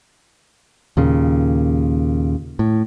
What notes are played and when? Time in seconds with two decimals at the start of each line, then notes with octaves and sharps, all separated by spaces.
0.97 D#2 A#2 C#3
2.59 A2